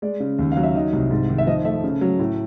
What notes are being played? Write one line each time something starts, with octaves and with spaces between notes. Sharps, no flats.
G#3 D5
C#3
D#2
F#3 F5
E5
D#3 D#5
C2
G#2
D#3
E5
F3 D#5
A3 E5
C#3
F#3
A2